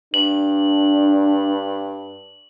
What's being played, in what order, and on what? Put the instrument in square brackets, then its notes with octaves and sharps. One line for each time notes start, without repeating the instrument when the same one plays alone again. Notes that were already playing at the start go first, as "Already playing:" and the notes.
[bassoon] G2 [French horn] D4 [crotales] F#7